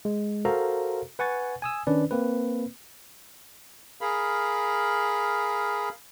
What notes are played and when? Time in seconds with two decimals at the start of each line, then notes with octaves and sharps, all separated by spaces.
0.05 G#3
0.45 F#4 A4 A#4 C5 F5 A#5
1.19 B4 F#5 G#5 C#6 A6
1.62 G#5 D#6 E6
1.87 D#3 C#4 D4 B4 D5
2.11 A#3 C4 B4
4.01 G#4 A#4 F5 B5